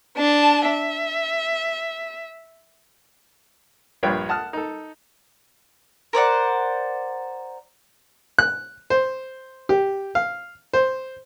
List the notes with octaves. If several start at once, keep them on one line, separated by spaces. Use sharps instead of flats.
D4 A5
E5
A#1 G2 F4 B4 C#5 G5
F#5 A5 D#6 F6
D#4 A4
A#4 C5 D5 F#5
F#6
C5
G4
F5
C5